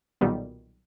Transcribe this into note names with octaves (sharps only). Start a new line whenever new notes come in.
B1 A#2 D#3 G3 B3